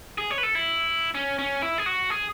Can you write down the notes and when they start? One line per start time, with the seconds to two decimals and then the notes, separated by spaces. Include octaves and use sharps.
0.18 G#4
0.30 C#5
0.38 B4
0.43 A4
0.55 E4
1.15 C#4
1.39 C#4
1.62 E4
1.78 G#4
1.86 F#4
2.10 G#4